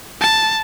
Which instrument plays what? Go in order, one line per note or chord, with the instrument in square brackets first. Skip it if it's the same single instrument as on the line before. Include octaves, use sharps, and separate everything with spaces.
[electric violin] A5